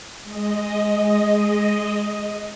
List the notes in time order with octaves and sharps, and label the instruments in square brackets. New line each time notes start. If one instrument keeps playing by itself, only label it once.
[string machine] G#3 D#5